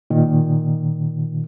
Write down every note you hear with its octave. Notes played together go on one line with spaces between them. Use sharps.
A#2 D#3